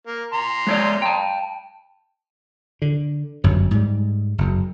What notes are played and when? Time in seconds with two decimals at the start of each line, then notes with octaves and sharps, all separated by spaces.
0.07 A#3
0.33 A#5 C6
0.67 G#3 C#5 D5
1.02 G5 A5
2.82 D3
3.44 G1 F#2 F#3
3.71 G#2 G3
4.38 F#1 F#2